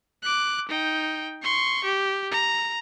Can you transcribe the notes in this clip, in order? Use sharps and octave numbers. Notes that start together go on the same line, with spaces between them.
D6 F#6
D#4 G5
C6 C#6
G4
A#5